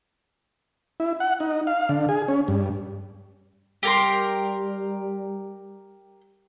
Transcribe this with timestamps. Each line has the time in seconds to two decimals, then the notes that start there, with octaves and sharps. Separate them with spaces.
1.00 E4
1.20 F#5
1.40 D#4
1.67 F5
1.89 D3
2.09 G#4
2.28 C#4
2.48 G2
3.83 G3 G4 A#4 C6